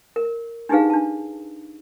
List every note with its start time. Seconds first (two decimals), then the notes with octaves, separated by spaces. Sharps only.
0.16 A#4
0.69 D4 D#4 G4 G#4 B4 F5
0.90 D4 A5